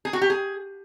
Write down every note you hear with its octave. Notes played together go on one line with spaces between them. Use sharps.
G#4
F#4
G4
G#4